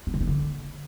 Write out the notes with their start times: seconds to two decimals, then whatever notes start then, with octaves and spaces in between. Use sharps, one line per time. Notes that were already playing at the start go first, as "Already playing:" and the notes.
0.07 B3
0.14 D3
0.21 D#3
0.27 D3